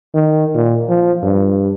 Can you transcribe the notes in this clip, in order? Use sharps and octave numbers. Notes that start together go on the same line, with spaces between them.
D#3
A#2
F3
G2